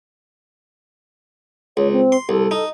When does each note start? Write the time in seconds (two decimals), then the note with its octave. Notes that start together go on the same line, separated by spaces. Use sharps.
1.77 C#2 C#5
1.91 C4
2.12 C6
2.29 C2 A4
2.51 D#4